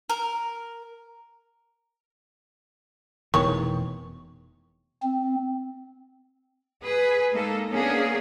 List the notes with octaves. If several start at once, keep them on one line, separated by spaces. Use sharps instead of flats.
A#4
F1 B2 D#3 E3 G#3 C#5 C#6
C4
G#4 B4
G#3 A#3 D#4 A4
A#3 B3 C#4 D4 G#4